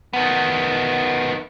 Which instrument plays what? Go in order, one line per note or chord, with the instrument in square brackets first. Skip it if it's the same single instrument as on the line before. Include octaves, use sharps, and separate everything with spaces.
[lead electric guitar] D#3 B3